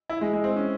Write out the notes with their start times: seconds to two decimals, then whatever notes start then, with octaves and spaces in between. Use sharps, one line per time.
0.10 E4
0.21 G#3
0.33 G#3
0.44 C4
0.57 C#4